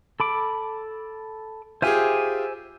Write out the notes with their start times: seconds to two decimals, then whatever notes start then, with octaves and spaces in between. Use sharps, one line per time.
0.20 A4 B5 D6
1.82 F4 G4 G#4 C5 E5 G#5